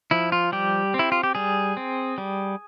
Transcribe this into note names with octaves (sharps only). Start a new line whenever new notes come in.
F3 E4
F4
G3 G4
C4
E4
F4
G4
G3 G#4
C4
G3